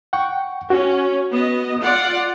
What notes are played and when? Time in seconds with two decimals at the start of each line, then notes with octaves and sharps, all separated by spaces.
0.13 F#5 G5 C#6
0.70 C#4 F#4
1.34 B3 D#5
1.81 F4 D5 F#5